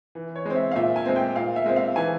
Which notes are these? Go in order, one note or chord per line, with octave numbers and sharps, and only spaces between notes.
E3
C#5
G#3 C4
E5
F5
A#2 E5
G#5
G#3 C4
G5
A#2 F5
E5
G#3 C4
F5
E3 G#5